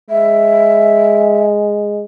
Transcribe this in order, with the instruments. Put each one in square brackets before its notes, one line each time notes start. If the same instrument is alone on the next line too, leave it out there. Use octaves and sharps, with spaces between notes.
[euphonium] G#3 [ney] E5